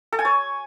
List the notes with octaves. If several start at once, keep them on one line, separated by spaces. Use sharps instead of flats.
A4
G#5
C#5